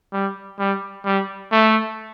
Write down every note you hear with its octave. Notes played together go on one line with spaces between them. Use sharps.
G3
G3
G3
A3